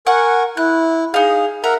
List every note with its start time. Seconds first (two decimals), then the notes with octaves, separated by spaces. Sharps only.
0.07 A#4 F#5 G#5 C#6
0.57 E4 F#6
1.14 D#4 G#4 F5
1.64 A#4 E5 F#5 A#5